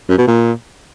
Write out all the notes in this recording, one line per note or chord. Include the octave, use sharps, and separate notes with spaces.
F#2
B2
A#2